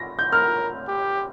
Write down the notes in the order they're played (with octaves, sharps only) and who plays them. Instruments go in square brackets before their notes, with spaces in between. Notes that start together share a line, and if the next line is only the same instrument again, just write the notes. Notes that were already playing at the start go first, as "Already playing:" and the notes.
Already playing: [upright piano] A#6
G6
[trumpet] A#4 [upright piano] F6
[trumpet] G4